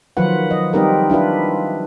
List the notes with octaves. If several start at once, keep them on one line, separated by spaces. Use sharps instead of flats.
D#3 F3 F#3 F4 B4 F#5
D#5
G3 C4 D#4 G4 A#4 B4
D4 E4 F4 B4